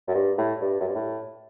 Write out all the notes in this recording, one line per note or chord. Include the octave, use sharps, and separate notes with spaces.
F#2
G2
A2
G2
F#2
G2
A2